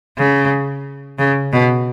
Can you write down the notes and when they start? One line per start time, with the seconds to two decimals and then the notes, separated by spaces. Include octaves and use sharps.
0.18 C#3
1.19 C#3
1.53 B2